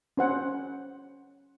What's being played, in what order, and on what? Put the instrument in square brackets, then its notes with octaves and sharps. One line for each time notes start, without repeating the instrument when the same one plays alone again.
[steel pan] C#4 C5 F#5